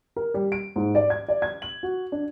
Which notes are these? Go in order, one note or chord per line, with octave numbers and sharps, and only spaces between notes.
A#4
G3
D7
G#2
D5
G#6
D5
G#6
F#7
F#4
D4